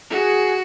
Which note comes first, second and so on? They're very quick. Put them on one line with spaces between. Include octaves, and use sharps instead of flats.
F#4 A4 G#4